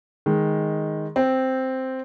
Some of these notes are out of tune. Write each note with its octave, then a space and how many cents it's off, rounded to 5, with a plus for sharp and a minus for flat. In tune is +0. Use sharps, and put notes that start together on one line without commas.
D#3 +5 G#3 +0
C4 +0 G5 +0